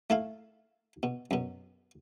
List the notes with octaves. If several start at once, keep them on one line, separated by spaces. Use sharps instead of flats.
A3 E4 F5
B2
F#2 B2